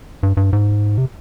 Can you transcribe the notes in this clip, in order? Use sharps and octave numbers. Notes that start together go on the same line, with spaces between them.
G2
G2
G#2
C3